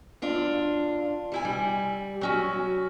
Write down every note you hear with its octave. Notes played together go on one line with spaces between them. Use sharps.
F#2 D4 F4
G3 E4 G#5
G3
F#3 C#4 F#4